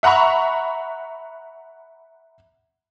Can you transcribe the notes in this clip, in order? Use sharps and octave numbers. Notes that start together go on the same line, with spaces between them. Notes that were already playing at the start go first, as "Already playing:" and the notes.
E5 F#5 A#5 B5 C#6